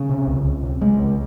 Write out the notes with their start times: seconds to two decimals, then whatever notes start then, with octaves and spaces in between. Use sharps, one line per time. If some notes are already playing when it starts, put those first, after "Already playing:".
Already playing: C#3
0.09 C3
0.27 C#2
0.45 C#2
0.63 C3
0.81 C#3 G#3
0.99 C#2